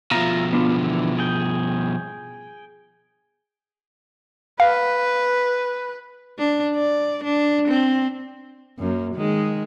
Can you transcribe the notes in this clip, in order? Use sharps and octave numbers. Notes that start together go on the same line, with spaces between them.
B2 F3 F4 E5 A#5
B3 D4 F4
D3 E3
G#4 G5
B4 F5
D4
D5
D4
C4
F#2 A#3
D#3 G#3